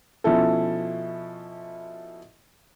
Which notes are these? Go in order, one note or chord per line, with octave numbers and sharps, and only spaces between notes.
B2 F3 C#4 E4 A4